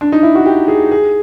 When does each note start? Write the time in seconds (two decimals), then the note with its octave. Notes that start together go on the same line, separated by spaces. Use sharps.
0.01 D4
0.12 D#4
0.23 E4
0.35 F#4
0.46 G4
0.68 G#4
0.91 G#4